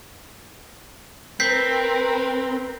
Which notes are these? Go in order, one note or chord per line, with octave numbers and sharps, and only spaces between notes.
C4 A#4 B4 G6 B6 C7